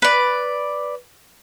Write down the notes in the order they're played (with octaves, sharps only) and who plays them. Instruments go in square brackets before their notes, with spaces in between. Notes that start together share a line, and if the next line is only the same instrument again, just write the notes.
[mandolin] B4 D5